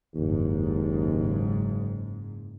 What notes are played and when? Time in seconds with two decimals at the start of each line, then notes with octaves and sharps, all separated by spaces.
0.16 F#1 D#2 G#2